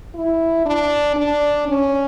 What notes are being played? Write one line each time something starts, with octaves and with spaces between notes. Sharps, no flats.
E4
D4
D4
C#4